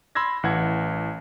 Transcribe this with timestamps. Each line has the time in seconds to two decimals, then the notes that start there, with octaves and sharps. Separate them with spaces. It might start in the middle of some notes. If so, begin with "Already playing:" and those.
0.15 B5 C6 E6 G#6 A#6
0.43 A1 E3 F#5 G#6